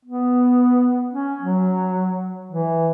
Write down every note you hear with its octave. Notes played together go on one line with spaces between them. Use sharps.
B3
C#4
F#3
E3